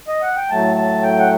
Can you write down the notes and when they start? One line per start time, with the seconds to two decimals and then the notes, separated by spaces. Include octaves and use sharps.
0.08 D#5
0.22 F#5
0.37 G5
0.50 A2 F#3 A3 A5
0.77 A5
1.03 G5
1.18 F#5